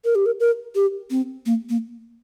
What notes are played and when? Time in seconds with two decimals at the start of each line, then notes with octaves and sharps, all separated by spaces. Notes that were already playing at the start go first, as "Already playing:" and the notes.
0.05 A#4
0.15 G4
0.26 A#4
0.40 A#4
0.75 G4
1.11 C4
1.46 A#3
1.69 A#3